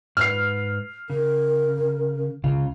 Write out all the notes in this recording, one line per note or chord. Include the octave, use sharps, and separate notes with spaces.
G#2 B4 F6 C7
C#3 A#4
C#2 C#3 F4